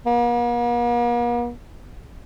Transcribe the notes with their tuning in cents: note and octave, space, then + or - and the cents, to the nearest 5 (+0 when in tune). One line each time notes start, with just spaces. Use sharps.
A#3 +45